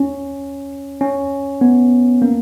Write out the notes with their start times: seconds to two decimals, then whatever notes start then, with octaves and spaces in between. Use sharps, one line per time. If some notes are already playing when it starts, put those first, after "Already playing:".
Already playing: C#4
1.01 C#4
1.61 B3
2.22 A#3